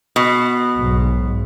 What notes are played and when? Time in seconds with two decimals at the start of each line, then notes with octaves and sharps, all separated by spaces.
0.16 B2
0.77 B1 G#2